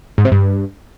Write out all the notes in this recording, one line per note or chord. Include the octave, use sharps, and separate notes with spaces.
G#2
C3
G2